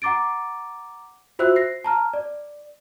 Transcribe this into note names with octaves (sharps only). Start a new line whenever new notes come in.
F#5 A#5 D6 A6 D7
F4 F#4 C5 E5 E6 F#6
A#6 C7
A5 A#5 F6
D5